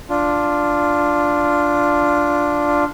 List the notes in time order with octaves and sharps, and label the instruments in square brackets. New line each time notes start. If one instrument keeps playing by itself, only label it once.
[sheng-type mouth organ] D4 F4